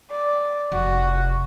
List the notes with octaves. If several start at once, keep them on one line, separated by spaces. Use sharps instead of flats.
D5
F1 F#4